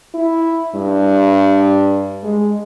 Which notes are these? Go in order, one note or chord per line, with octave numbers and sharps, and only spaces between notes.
E4
G2
G#3